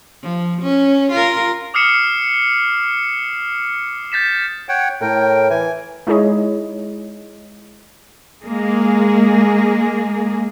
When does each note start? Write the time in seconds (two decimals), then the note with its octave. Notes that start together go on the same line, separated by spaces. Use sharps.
0.22 F3
0.62 C#4
1.12 F4 A#4
1.74 D6 D#6 F6 C7 C#7 E7
4.12 G6 A6 B6 E7
4.69 C#5 F#5 G5
5.01 A2 A#4 G5
5.50 E3 G#5
6.07 G#3 D#4 E4 G#4 C#5 D#5
8.44 G#3 A#3 G#4